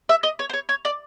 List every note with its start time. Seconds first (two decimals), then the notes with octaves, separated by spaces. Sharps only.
0.09 E5
0.23 D#5
0.39 C#5
0.49 C5
0.53 C#5
0.69 C#5
0.85 D5